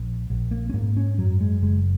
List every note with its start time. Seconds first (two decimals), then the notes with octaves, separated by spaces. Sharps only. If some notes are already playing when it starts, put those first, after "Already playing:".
Already playing: A#1
0.30 A#1
0.51 A#3
0.70 C#4
0.74 G#2 A#3
0.97 C#4
1.18 F#2 F#3
1.40 G#3
1.62 F#1 G#3